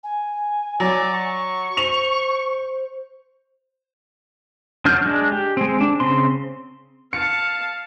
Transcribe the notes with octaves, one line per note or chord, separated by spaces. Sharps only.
G#5
F#3 D5
C#6
C5 F7
F#3 D4 F#4 F6 G6
G#3 D4
G4
G#3 C4
D4
C#3 C4 C6
F5 A5 C#7